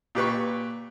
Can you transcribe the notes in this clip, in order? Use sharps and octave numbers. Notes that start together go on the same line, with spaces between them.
A#2 G4 B4 C#6